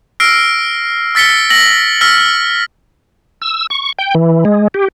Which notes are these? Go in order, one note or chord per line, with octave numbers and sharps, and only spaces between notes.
E6 F6 A#6 C7 D7
E6 A6 B6 C#7 G7
E6 A#6 F#7
E6 F6 A#6 B6
E6
C#6
G5
E3
G#3
G4